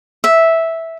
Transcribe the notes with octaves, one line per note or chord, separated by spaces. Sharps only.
E5